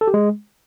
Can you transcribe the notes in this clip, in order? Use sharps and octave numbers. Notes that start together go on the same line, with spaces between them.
A4
G4
G#3